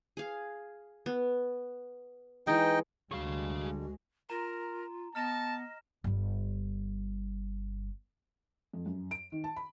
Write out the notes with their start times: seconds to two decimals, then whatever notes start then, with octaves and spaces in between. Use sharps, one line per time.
0.17 G#4 F5
1.06 B3
2.47 E3 G#3 D#4 D#5 G5
3.11 D2 D3 G3 G#3 F#4 G#4 C#5 F5
4.30 F4 A#4 A#5
5.15 B3 D#5 A5 F6 A#6 E7
6.04 G1 G3
8.73 F2
8.86 F#2
9.11 D7
9.32 D#3
9.44 A5
9.56 B5